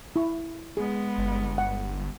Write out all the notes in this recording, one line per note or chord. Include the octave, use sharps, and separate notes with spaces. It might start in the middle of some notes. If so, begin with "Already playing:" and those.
E4 C#6
G#3 B3 G#4
G1
F#5